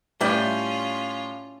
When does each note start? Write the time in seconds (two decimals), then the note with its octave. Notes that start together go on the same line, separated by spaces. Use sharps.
0.21 A2 G3 C#4 E4 F4 D5 G5